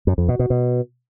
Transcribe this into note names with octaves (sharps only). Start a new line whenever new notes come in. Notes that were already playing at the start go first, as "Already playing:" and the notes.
F#2
F2
B2
B2
B2